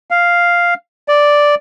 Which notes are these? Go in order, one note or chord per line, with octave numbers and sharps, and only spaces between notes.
F5
D5